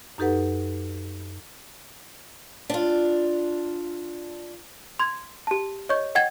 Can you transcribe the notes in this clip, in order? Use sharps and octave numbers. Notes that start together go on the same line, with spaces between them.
F#2 D#4 G4 A4 B4 F#5
D4 F4
C6 G#6
G4 A5
C#5 D#5 C#6 G6
D#5 F#5 G5 G#6 A6